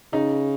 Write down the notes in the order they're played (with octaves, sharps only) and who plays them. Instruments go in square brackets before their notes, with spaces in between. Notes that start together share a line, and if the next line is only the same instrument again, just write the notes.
[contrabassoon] C#3 [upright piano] D#4